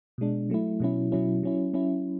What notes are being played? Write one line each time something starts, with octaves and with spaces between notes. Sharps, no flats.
B2 G#3 D4
F#3 A3 E4
B2 F#3 C#4 E4
B2 F#3 C#4 E4
F#3 C#4 E4
F#3 C#4 E4